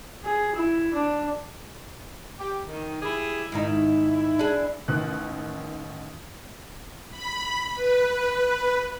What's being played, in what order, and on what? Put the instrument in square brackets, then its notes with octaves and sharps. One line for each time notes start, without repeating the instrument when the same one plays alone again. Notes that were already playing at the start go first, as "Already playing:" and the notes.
[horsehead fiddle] G#4
E4
D4
[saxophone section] G4
D#3
E4 G4 G#4
[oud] G#2 D#3 D#4 [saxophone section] E4
[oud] D4 G#4
[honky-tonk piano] A1 D#3 F#6
[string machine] B5
B4